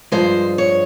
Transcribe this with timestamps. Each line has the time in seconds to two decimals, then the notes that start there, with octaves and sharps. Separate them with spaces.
0.12 G2 F3 G#3 C5
0.58 C#5